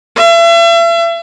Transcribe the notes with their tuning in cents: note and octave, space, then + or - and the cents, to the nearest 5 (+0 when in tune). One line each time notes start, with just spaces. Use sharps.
E5 +40